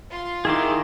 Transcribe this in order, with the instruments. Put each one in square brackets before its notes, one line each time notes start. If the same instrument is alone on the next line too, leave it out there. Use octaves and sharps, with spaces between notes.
[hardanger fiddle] F4 C6
[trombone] D#3 [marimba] D#4 E4 [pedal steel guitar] G#4 E5 D6